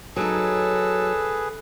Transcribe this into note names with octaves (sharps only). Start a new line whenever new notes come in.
F#3 D#4 G#4 A4 B4